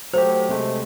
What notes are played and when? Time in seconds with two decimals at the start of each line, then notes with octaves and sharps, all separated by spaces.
0.13 F#3 A3 G4 C5
0.49 C3 G#3 A3